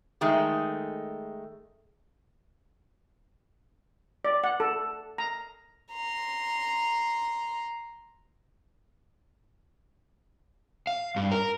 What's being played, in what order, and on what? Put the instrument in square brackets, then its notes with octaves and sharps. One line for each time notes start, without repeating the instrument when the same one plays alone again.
[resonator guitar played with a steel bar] D#3 G#3 A3 G#4
[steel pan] D5
F#5
A4
A#5
[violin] A#5 C6
[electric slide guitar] F5
G2
A#4